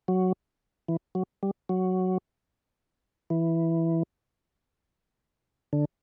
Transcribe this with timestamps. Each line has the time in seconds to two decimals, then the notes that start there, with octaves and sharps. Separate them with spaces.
0.08 F#3
0.88 E3
1.15 F#3
1.43 G3
1.69 F#3
3.30 E3
5.73 D3